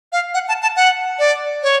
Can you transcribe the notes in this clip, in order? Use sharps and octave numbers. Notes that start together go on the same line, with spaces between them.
F5
F#5
A5
A5
F#5
D5
C#5